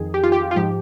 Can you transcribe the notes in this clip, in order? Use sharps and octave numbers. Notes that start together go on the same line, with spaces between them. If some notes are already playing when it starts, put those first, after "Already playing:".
Already playing: F2 D#3 G#4
G4
F4
G4
F4
G#2 F3 G4